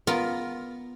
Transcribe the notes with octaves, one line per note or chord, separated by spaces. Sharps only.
B3 F4 A#4